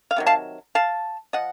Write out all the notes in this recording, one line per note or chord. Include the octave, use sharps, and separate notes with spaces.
F5
C3 D#3 F#3
F5 A5
F5 A5
F3 D#5 F#5